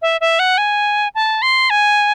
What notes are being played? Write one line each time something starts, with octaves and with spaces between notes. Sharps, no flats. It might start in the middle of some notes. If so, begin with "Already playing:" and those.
E5
E5
F#5
G#5
A5
C6
G#5